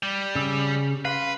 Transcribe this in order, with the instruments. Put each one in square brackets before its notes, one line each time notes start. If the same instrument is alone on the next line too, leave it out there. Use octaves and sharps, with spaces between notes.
[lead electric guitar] G3
[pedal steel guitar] C#3 E6
[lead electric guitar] B4 [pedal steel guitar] F5 C6